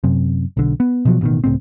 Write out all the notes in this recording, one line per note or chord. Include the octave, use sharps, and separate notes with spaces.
F#2 C3
B1 D3
B3
B2 F3 F#3
A1 B2 D#3
C#2 A2 C4